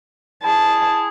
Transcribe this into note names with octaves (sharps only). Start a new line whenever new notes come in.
E4 G#4 A5